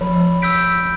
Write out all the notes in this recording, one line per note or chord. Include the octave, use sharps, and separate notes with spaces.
F3 B5
E6 G6 B6 D7